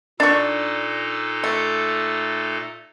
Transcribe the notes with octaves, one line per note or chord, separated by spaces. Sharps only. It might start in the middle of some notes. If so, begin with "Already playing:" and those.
A#2 D4 D#4 A4 C#6
A3